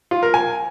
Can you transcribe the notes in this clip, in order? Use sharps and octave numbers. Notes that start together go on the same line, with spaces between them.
F4
A#4
G#5